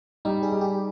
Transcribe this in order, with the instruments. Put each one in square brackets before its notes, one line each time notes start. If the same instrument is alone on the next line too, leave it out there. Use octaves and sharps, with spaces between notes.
[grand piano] G3 [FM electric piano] D#4
[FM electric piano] G#4
[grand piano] G3
[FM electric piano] G4